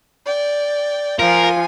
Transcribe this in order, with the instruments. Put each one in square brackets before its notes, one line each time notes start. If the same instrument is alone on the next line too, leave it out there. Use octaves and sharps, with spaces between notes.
[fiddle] D5 G5
[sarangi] F3 [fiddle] F4 G#5 [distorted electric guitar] A#4